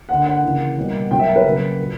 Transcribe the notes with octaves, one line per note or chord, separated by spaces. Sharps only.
D3 A#3 F#5
F#5
C#3 E3 A#3
B2 G3 A#3
B2 F#3 A#3 G5
E5
A#4
B4
C#3 F#3 A#3
A#2 A#3